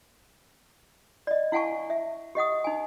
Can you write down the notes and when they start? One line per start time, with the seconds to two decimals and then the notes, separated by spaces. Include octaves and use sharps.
1.27 D5 D#5
1.52 E4 F5 F#5 G#5 A5 C#6
1.90 E5
2.35 G4 D#5 F#5 D#6
2.64 D#4 G#5